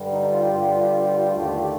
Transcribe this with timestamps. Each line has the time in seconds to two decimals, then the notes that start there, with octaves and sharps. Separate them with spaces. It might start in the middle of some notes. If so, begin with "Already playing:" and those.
Already playing: G2 D3 G3
0.12 D#4
0.32 F4
0.41 G4
0.51 G2 D3 G3 F4
0.61 G4
0.70 F4
0.80 G4
0.90 F4
0.99 G4
1.09 F4
1.18 G4
1.28 D#2 D3 A3 F4
1.38 G4
1.47 F4
1.57 G4